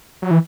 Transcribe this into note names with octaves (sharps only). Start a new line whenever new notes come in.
F#3
E3